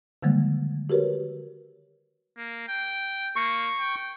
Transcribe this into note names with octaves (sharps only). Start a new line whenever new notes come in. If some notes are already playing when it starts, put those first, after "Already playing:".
D3 D#3 F3 G3 G#3 A#3
F#4 G4 A#4 B4 C#5
A#3
G5
A#3 C#6
G5